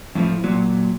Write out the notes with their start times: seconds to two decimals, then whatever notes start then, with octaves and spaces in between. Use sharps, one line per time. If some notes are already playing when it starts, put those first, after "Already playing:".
0.15 F2 A2 D3 F3
0.44 A#2 F#3